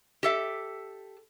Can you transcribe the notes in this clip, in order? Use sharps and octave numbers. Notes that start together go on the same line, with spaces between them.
G4 A4 E5